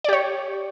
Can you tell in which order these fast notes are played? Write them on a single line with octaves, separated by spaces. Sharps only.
D5 G4 C#5